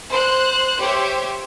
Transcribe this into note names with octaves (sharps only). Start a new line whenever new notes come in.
C5 F#6
G4 C5 C#5 E5